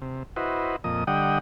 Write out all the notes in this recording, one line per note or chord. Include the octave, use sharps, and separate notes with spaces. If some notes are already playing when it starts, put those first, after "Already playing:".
C3
E4 F#4 B4 C5 D#5
F2 A#2 D#5 D#6
D3 G3 D#5 F#5 G5 D#6